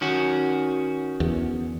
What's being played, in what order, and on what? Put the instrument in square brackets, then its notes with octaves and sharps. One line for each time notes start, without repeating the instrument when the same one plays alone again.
[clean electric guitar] D#3 C#4 F#4
[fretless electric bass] E2